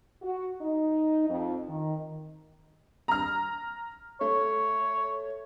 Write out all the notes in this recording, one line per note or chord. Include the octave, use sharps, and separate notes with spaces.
F#4
D#4
F2
D#3
A#5 F6
A3 C#5